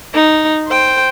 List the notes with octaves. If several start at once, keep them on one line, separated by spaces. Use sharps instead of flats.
D#4
C5 G5